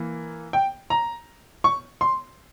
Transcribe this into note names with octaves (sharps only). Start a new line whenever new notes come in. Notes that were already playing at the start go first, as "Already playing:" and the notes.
Already playing: E3 A#3
G5
A#5
C#6
C6